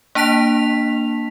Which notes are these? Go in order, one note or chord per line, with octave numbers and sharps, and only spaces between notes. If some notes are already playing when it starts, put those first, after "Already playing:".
A#3 D4 A5 B6 F7